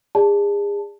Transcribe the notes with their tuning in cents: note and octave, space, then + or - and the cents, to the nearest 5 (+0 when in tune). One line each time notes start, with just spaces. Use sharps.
G#4 -35 D5 +0 A5 +0